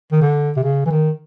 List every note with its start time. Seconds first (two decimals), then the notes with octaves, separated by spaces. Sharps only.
0.12 D#3
0.22 D3
0.56 C3
0.63 C#3
0.86 E3
0.91 D#3